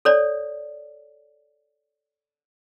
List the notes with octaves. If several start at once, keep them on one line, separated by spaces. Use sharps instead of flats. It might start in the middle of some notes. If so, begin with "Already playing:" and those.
A4 C#5 D5